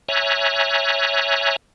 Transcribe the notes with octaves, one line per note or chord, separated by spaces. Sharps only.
C#5 E5 G#5 A#5 F#6